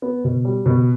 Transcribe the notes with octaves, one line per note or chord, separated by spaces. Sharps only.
B3
B2
G3
B2